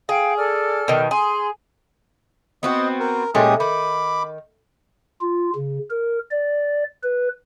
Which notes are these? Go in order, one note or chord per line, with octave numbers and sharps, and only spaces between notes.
G#4 F5 G5
A4 D5 F6
B2 D#3
G#4 C6
B3 C4 F#4 D#5
A#4
A#2 G#3 A3 C#4 G4 D#6
D#3 B5 D6
F4
C#3
A#4
D5
B4